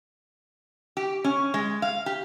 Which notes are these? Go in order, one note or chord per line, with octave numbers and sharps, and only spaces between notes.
G4
C#4
G#3
F5
G4